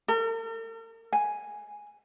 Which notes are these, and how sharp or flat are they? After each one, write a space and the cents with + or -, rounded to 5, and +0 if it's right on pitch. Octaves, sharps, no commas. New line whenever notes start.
A#4 -45
G#5 +0